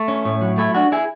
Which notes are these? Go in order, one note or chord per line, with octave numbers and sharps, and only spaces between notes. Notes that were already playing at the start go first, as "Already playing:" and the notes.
Already playing: A3
C#4
A2
F#3
A3 E4
D4 F#4
E4 G#4